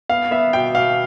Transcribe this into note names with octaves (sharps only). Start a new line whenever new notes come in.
B3 F5
B3 E5
B2 G5
B2 F5